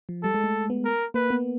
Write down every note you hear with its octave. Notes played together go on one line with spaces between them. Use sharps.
F3
G3 A4
G#3
A3
B3
A#4
A#3 B4
B3